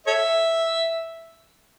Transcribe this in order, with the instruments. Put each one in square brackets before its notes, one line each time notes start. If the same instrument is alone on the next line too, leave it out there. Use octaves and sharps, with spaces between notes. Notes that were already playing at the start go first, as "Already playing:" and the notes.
[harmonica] A4 C#5 E5